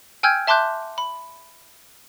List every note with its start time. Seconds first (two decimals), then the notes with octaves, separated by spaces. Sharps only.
0.23 G5 G#5 E6 F6 G6 G#6
0.47 E5 A5 C6 D6 F#6 G6
0.98 B5